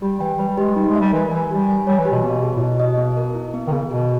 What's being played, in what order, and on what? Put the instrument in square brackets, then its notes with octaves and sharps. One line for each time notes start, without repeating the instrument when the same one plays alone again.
[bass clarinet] G3 [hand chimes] G4
[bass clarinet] E3 [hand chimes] G5
[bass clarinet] G3 [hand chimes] B4
[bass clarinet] G3
[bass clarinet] G#3 [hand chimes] G4
[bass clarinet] G3 [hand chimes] D#4
[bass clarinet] G#3
[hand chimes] E5
[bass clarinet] G3
[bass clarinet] E3 [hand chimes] A#4
[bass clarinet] E3 [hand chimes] G#5
[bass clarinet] G3 [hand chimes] G4
[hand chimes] G#5
[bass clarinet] G3 [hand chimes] C#5
[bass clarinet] E3
[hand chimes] G4
[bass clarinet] B2
[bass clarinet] B2 [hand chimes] B3
[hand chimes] G#4
[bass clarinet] A#2
[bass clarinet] B2 [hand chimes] E4
[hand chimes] D#5
B3
A#4
E4
B3
[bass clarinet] D#3
[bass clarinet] C#3 [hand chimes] B3
[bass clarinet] B2 [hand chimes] G#4